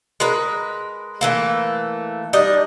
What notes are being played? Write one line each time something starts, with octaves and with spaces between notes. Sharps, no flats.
G#3 A#4 B4
E3 A3 A#3
G3 D4 D#4 D#5